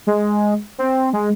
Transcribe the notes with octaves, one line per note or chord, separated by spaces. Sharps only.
G#3
C4
G#3